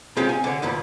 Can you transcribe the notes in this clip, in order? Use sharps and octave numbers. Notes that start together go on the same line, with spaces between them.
G#3 C4 C#4 F4 G4
G#5
D3 C#5
D2 G2 A#2 B5